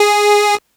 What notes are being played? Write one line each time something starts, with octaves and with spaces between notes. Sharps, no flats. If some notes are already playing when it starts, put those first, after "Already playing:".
Already playing: G#4